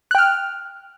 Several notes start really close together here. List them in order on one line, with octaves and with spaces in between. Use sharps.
F#6 G5 F6